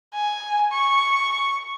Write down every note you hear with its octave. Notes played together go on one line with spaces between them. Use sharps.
G#5
C#6